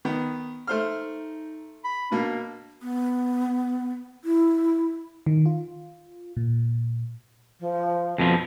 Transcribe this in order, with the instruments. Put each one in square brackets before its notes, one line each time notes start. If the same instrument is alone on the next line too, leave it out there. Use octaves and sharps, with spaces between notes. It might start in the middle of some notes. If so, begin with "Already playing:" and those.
[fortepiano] D#3 B3
[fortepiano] A3 C5 F6 [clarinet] D#4
[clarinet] B5
[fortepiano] B2 A#3 [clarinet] D4
[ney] B3
E4
[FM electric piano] D#3
F4
A#2
[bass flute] F3
[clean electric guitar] F2 B2 F3